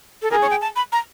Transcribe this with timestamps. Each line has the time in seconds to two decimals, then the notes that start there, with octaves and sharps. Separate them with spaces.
0.22 A4
0.31 G#4 A#4
0.42 C#5
0.51 G5
0.61 A5
0.76 B5
0.92 A#5